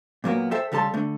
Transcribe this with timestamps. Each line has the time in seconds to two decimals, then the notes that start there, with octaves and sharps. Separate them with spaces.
0.24 A#2 F#3 A#3 B3
0.51 A4 C5 E5 G5
0.72 C#3 G3 A4 A5 C6
0.94 D3 A3